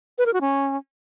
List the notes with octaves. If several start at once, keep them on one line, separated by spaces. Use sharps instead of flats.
B4
A#4
F#4
C#4